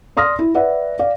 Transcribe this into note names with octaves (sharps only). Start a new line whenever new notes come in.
D5 C6 D#6 F6 A#6
E4
B4 D5 E5 F#5
D5 F5